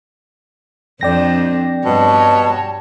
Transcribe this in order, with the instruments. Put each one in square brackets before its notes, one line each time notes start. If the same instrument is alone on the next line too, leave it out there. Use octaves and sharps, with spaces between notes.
[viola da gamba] F2 C4 D4 [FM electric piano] D5 G5 A#6
[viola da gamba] G2 C#5 [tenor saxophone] B2 [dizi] A5